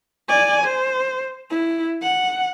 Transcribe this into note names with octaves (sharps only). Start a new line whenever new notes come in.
D5 G#5
C5
E4
F#5